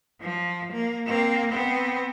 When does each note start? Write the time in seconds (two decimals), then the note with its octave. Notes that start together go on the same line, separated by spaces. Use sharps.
0.21 F3
0.72 A#3
1.06 A#3 C4
1.49 B3 C4